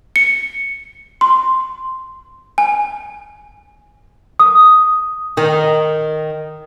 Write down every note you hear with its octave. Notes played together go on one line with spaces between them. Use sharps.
C#7
C6
G#5
D#6
D#3